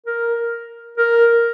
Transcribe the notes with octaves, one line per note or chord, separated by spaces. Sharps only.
A#4
A#4